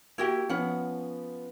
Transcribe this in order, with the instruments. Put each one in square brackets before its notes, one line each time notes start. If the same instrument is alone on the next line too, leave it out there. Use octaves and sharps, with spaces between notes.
[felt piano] A#3 [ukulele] E4 F#4 G4
[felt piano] F3 B3 [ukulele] C#4 F#5